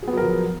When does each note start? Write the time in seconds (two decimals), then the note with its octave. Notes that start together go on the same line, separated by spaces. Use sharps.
0.03 G#4
0.08 B3
0.12 F#3
0.17 A#4
0.22 F3